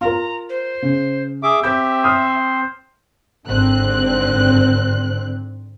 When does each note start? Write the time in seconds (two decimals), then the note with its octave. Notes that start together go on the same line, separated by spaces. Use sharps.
0.01 F4 A#4 A#5
0.49 C5
0.82 C#3
1.43 G#4 E5 D6
1.63 C4 G4 E5 G6
2.04 C5 D#6 F6
3.47 G#1 D3 C4 F#6